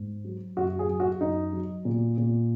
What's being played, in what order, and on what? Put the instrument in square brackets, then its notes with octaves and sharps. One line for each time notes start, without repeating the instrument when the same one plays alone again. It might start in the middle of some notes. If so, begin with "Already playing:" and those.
Already playing: [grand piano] G#2
F#3
F#2 F#4
G#4
F#3
F#4
F#2 D#4
F#3
A#2
A#2